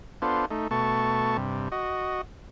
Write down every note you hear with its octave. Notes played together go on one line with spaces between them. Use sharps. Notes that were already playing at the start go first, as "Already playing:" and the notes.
B3 D4 F4 A4 C5
A3 D#4
B2 A3 A5 C#6
G2 C3
F#4 D#5